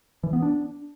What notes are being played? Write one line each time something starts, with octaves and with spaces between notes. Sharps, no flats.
E3
B3
D4